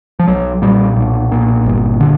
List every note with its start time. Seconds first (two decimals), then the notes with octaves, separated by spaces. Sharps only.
0.19 F3
0.28 B1 F#3
0.62 A#2 G3
0.96 B1
1.32 A#2
1.66 G1
2.00 D3